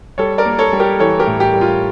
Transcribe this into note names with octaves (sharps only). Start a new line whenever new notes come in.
G3 A4 C#5
A#4 D5
A#3
A4 C#5
G3
G4 A#4
E3 A4 C#5
G4 A#4
A2
G4
G3
F4